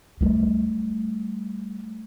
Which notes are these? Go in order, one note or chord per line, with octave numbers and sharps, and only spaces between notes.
G3 A3